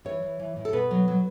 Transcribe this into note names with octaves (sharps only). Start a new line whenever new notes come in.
E3 C#5
E3
E3
A2
A4
B2 B4
F#3
F#3